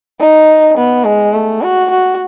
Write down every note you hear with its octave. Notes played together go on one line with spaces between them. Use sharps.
D#4
B3
G#3
A3
F#4
F#4